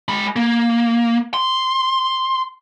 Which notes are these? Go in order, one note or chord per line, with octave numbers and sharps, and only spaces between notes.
G#3 B5
A#3
C6